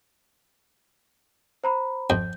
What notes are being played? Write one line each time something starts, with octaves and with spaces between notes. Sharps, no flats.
C5 A#5 B5
F2 G6